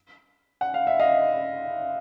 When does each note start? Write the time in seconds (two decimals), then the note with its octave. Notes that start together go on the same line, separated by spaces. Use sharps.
0.61 F#5
0.74 F5
0.87 E5
0.99 D#5 F5